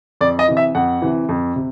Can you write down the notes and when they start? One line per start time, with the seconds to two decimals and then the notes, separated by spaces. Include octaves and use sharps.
0.21 F2 D5
0.39 D#5
0.48 C3 E3
0.57 E5
0.75 F2 F#5
1.02 C3 E3
1.29 F2
1.56 C3